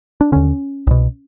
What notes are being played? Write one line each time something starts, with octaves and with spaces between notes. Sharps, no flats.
D4
D#2 D3 C#4
C2 B2